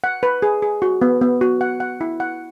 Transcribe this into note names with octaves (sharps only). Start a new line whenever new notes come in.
F#5
B4
G#4
G#4
F#4
B3
B3
F#4
F#5
F#5
E4
F#5